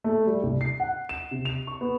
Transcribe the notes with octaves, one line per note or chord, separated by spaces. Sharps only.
A3
G3
C2
C7
F#5
E7
C3
F7
C#6
B3